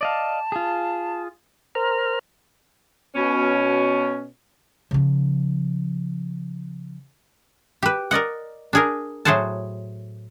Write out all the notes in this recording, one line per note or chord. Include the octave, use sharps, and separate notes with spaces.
D5 D#5 F5 A5
F4 G#4
A#4 C5 A#5 F6
B2 C#4
C#3 F3
G4 B4
A#4 D5 D#5 F#5
D4 G#4 A#4
A2 F#3 G#4 C5 F#5 A5